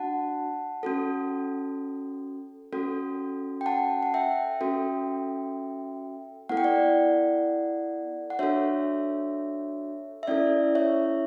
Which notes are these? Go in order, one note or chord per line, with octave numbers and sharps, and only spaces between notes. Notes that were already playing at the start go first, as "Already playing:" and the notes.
Already playing: D4 F#4 F#5 A5
C#4 F#4 A4
C#4 F#4 A4
G5
F#5 A5
F#5
E5 G5
C#4 F#4 A4
B3 E4 A4 F#5
G5
D5 F#5
F#5
D4 F#4 A4 C#5 E5
E5
C#4 E4 A4 D5
C#5 E5